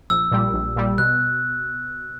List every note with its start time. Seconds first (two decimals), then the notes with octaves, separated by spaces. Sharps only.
0.10 A#1 E6
0.31 A#2 G3
0.54 A#1
0.76 A#2 G3
0.98 B2 F#6